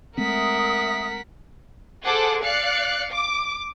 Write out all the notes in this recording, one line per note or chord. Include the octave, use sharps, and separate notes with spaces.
G#3 A3 C4 A#4 E5 F#5 D#6 B6
G#4 A4 C5 F#5 D6
D5 F5 F#6 C#7
D6